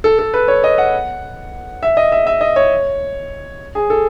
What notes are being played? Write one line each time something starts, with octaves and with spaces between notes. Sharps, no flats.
A4
A4
B4
C#5
D#5
F#5
E5
D#5
E5
E5
D#5
C#5
G#4
A4